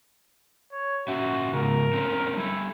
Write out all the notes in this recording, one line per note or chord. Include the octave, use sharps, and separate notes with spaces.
C#5
A#2 C#4 F#4 E5
G#2 C#3 A#4
A3 C4 C#4
G3 E4 A4